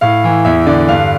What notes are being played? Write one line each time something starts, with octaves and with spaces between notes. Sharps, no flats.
A2 F5
E3
E2 E5
D3 D5
G2 F5